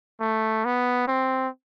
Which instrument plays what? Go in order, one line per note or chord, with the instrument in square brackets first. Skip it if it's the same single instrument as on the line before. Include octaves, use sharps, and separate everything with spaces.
[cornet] A3
B3
C4